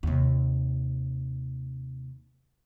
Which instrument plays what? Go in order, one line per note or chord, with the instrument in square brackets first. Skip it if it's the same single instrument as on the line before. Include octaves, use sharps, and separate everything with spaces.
[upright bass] D#2 C3